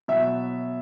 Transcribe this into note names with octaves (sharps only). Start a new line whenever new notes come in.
B2 F#3 E5